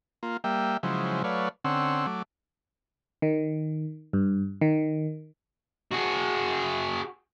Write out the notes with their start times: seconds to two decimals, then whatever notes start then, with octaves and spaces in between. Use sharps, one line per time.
0.23 A#3 F4
0.44 G3 A#3 E5 G5
0.83 C#3 F3 F#3 G#3 E4 C5
1.24 F#3 A3 B4 C#5 D5 F5
1.65 D3 C4 C#4 F#5 C6 E6
2.06 F#3 A3 D6
3.22 D#3
4.13 G2
4.61 D#3
5.91 F#4 G#4